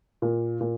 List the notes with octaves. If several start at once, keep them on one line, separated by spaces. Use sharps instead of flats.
A#2
A#2